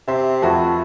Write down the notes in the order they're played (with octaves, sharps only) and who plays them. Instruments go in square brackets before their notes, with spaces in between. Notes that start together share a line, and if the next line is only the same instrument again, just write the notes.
[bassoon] C3 [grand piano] E5 C6
[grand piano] F2 F#4 [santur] A3 B4